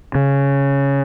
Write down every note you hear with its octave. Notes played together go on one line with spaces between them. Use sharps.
C#3